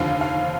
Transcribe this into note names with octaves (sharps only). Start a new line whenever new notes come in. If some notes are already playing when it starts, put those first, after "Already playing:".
Already playing: F1 D#2 D3 F3 F5
F5